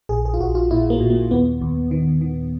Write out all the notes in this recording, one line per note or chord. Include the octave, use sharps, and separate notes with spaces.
A#1 G#4
G#4
F4
A#1 F#4
F4
A#2 E4
A#3
A#2
A#3
D#2 B3
D#2
D#3
D#3